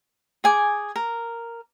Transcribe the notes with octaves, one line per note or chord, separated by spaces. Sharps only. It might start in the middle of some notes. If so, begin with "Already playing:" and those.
G#4 G#5 D6
A#4